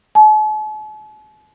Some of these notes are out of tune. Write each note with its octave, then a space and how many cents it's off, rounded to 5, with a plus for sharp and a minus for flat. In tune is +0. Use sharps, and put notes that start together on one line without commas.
A5 -45